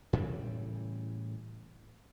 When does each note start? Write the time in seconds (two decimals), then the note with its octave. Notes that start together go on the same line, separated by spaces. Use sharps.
0.13 A2 C#3 E3 G3